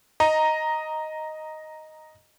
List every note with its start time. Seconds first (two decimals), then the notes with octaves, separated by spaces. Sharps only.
0.20 D#5 A#5